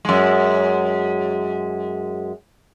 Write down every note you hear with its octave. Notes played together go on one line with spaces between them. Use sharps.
F#2 G#3